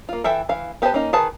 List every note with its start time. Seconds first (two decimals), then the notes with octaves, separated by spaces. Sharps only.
0.09 A#3 F4
0.24 E3 A4 E5 G5
0.49 E3 F5
0.82 B3 G4 B4 C5 A5
0.94 A#3 C#4 D#4
1.13 D#3 G#4 B4 A5